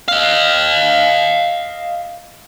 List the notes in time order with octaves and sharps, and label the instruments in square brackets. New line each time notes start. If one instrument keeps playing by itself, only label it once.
[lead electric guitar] D#5 F5